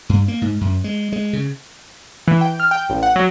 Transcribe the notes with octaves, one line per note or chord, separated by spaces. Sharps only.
G2
A#3
G#2
F#2
G#3
G#3
C#3
E3
G5
F6
G5
A1
F#5
F#3